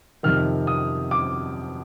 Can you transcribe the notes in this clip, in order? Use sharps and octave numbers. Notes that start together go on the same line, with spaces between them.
F2 C3 D#3 F6
D#6
D6